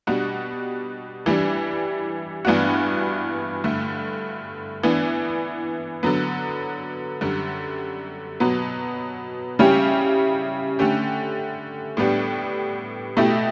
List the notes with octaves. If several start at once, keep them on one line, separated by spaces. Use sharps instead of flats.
B2 G3 D4 F#4
E3 G3 D4
G2 E3 B3 D4 F#4
G2 D3 A3
E3 B3 D4
D3 F#3 B3
F#2 D3 G3
B2 F#3 B3
C#3 G3 C#4 E4 G4
D3 A3 C#4 G4
A2 G3 B3 D4 G4
B2 A3 E4 G4